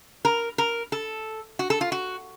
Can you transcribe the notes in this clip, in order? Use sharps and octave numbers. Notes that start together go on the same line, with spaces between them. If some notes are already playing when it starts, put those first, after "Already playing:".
A#4
A#4
A4
F#4
A4
F4
F#4